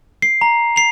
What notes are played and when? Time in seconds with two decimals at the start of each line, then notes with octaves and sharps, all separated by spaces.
0.22 C7
0.41 A#5
0.76 C7 F7